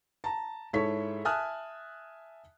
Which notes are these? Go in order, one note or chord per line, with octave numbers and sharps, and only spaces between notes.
A5 A#5
G#2 E4 A4 C#5 C#6 B6
E5 G#5 A5 D#6 F6 F#6